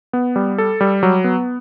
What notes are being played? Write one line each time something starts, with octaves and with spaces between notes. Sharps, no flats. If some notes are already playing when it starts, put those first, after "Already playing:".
B3
G3
A4
G3
F#3
B3